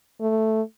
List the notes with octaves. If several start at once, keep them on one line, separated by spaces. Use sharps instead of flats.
A3